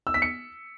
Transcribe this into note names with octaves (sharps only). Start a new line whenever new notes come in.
E6
B6
C#7